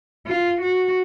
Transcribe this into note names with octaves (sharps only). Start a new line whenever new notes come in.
F4
F#4